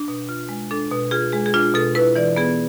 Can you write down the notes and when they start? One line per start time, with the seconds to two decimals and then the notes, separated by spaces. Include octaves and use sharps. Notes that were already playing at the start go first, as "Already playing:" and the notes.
Already playing: D4
0.08 B2
0.29 F4
0.49 G#3
0.71 D4 A4
0.91 B2
1.11 F4 G#4
1.32 G#3 G#4
1.46 G#4
1.54 D4 F4
1.74 B2 A4
1.95 E4 B4
2.15 E3 D5
2.36 B3 G#4